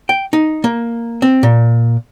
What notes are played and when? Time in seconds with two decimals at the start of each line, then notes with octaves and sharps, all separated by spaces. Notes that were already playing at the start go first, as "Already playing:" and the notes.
0.09 G5
0.33 D#4
0.64 A#3
1.22 C4
1.43 A#2